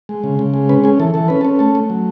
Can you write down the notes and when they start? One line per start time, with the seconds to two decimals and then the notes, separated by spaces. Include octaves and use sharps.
0.09 G#3
0.24 C#3
0.39 C#3
0.54 G#3
0.69 C#4 B4
0.84 C#4 G#4
1.00 E3 A4
1.14 E3 A4
1.28 C#4 B4
1.41 A4
1.45 C#4
1.59 A3 A4
1.75 A3
1.90 F#3